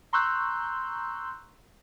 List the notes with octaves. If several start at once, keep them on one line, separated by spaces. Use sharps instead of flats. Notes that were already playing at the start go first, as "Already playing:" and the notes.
A#5 C6 C#6 E6 F#6 G6